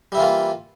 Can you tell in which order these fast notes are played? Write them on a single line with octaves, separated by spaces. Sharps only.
G3 E4 E3 F4 A#3